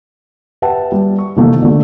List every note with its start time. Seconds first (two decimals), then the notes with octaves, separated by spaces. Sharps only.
0.62 G4 B4 E5 F#5 G5 A5
0.92 G3
1.19 C#6
1.36 C3 D#3 E3 A3 A#3
1.62 D3 A3